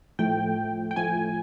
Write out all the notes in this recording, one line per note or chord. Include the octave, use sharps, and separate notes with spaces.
A2 F3 A3 G5
G5
A2 F3 A3 G#5